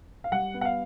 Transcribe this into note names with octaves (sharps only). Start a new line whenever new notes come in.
F5
G3 F#5
B3
F#5
F5